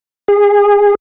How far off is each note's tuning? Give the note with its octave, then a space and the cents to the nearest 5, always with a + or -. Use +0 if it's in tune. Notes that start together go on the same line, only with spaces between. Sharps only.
G#4 -25